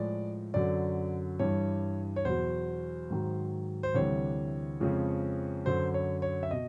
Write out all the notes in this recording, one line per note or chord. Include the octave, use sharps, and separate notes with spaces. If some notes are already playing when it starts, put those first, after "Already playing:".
Already playing: A2 F3 G#3 D5
F#2 D3 F#3 D5
G2 E3 G3 C#5
C#5
E2 B2 F#3 C5
G#2 D#3 F#3
C5
D2 C3 E3 G3 C#5
F2 C#3 F3 G#3
F#2 D3 F#3 C5
C#5
C#5
E5
B2 D#5